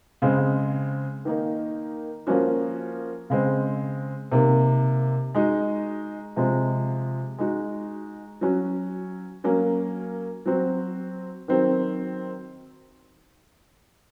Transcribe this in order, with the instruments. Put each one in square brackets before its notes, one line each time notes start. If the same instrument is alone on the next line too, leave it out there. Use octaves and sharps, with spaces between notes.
[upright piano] C#3 G#3 C4
D#3 A#3 D#4
F3 A#3 C#4 F#4
C#3 G#3 C4
C3 D#3 A#3
G#3 D#4 F#4
C3 F3 G#3
G#3 D#4 F#4
F#3 C#4 F#4
F#3 A#3 C#4
F#3 C4 F#4
D#3 F#3 C4